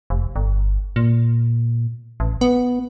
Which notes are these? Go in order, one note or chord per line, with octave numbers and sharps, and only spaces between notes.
F1
G1
A#2
A1
B3